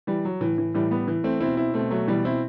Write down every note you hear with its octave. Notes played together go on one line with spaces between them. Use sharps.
E3 G3
F#3
A2 E3
E3
A2 E3 G3
G3 B3
E3
A3 C4
B2 C4 E4
C4 E4
B2 A3 C4
F#3 A3
B2 E3 G3
C4 E4